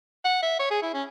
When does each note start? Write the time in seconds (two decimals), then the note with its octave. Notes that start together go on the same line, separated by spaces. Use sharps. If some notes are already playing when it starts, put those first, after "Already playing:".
0.25 F#5
0.42 E5
0.59 C#5
0.71 G#4
0.82 E4
0.94 C#4